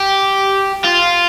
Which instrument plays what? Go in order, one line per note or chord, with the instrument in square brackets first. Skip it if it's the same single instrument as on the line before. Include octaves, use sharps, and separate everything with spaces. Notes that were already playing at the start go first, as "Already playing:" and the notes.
Already playing: [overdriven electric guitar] G4
F4